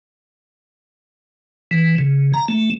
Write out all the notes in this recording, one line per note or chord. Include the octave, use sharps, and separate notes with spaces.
E3
C#3
A#5
A3